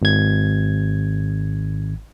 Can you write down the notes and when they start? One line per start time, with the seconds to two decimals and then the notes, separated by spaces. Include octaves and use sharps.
0.02 G#1 G#6